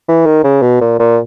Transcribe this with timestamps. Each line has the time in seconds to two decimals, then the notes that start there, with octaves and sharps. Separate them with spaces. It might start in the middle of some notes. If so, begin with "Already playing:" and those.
0.09 E3
0.26 D#3
0.44 C#3
0.62 B2
0.81 A#2
0.99 A#2